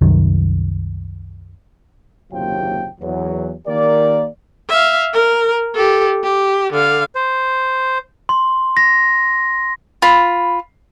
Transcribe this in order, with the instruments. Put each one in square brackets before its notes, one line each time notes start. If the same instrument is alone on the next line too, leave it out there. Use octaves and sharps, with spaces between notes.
[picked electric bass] C2 F#2 D#3
[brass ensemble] F#1 D#2 C3 F#3 F4 G5
E2 F#3
D#3 A#3 G4 A#4 D5
[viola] E5 F5
A#4
G4 A4
G4
D3 F5
[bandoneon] C5
[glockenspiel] C6
A#6
[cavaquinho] F4 B5